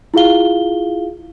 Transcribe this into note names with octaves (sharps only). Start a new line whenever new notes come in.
E4 F4 G#4 F5 G7